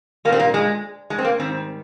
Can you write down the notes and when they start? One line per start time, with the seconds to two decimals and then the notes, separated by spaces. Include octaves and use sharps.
0.25 G3 A#3
0.29 A#2 C4
0.39 A#3
0.54 G#3
1.10 G#3
1.18 C4
1.25 A#3
1.38 G#2 D#3 G3 C4